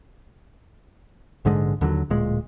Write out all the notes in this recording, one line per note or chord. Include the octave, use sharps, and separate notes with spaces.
A#1 G#2 D3 G#3
D#2 D3 D#3 F#3
D1 A#2 G#3